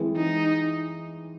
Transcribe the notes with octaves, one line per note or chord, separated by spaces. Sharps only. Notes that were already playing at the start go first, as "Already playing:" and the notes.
Already playing: E3 G#3 C4
D#4